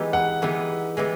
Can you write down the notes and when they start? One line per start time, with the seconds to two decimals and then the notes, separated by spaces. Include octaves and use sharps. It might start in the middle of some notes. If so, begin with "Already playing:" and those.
Already playing: E3 G#3 B3 D#4 G4
0.13 F#5
0.42 E3 G#3 B3 D#4 G4
0.97 E3 G#3 B3 G4